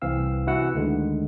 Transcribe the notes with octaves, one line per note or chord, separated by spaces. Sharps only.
C2 E3 C4 F5 E6
C3 E3 E4 F#4 F#5 E6
D2 D3 D#3 G#3